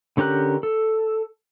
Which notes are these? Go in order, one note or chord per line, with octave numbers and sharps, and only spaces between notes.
D3 C#4 G4 A#4 F#6
A4